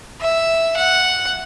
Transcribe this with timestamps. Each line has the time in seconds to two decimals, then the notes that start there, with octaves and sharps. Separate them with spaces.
0.21 E5
0.77 F#5